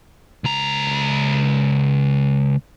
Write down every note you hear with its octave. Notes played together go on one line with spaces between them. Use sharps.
C#2 A#5